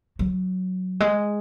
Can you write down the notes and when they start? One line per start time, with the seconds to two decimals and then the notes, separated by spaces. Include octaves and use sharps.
0.19 F#3
1.00 G#3